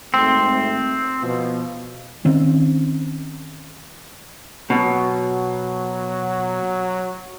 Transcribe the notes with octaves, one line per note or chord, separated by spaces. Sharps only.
G#1 A3 C4
B2 F3
D#3 C4 C#4
B2 F#3